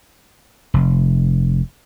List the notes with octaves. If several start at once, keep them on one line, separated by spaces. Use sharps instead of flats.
F1